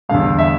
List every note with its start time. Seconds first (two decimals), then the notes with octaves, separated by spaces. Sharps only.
0.09 E2 D3 G3 F5
0.39 E5